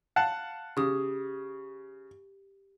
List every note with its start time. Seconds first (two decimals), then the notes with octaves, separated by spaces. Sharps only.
0.16 F5 F#5 A5
0.77 C#3 G4 D#6